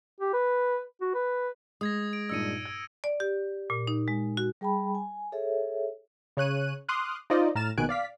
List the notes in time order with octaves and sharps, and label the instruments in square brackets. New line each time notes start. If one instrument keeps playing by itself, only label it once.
[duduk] G4
B4
F#4
B4
[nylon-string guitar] G#3 [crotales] D#6 G#6 A#6
[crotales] D7
[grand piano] G2 A#2 D#4 [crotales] E6 C#7 D#7
[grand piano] G#6
[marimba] D5
G4
A#2
D#4
G#3
F#4
[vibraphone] G3 G#4 G5 A5 B5
G#5
G#4 A4 C#5 E5
[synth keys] C#3 C#5 F#6 D#7
C6 D6 D#6 F6 F#6
D#4 F4 C5 D5 D#5
A2 A#5 F6 A6 E7
A#1 B2 D#3 G#5 F#6 D7
D5 F5 B6